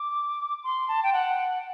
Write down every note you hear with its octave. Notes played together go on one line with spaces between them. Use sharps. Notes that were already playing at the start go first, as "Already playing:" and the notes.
Already playing: D6
C6
A5
G5
F#5